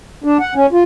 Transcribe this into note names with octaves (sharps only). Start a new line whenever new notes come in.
D4
F#5
C#4
F4